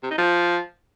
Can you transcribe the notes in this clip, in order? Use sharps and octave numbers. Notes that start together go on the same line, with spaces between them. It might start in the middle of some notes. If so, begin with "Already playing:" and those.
C3
D#4
F3